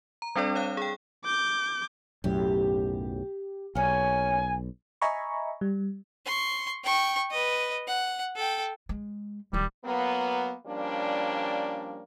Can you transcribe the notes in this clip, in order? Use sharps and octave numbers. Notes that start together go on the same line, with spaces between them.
A#5
G3 C4 D4 A4 D5
C#5 F5 F#6
G#4 G5
D6 G6
B1 F#2 A2 G4
B1 A#3 C#4 G#5
D#5 E5 G#5 A#5 B5 C#6
G3
C6 C#6
G5 C#6
B4 D#5
F#5
A4 G5
G#3
D1 D#3 G3 C4
F#3 A#3 B3
F3 G3 A#3 C#4 D4